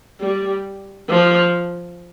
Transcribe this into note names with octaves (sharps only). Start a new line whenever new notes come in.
G3
F3